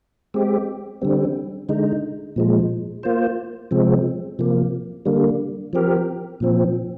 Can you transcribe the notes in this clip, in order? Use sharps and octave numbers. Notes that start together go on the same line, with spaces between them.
G#3 C4 G4
D3 G3 C4
D3 G#3 D#4
A#2 F3 G#3
A#3 F4 C5
C3 F3 G#3 C4
C3 F3 A#3
D3 G3 A#3
F3 C4 G4 A#4
A#2 F3 C4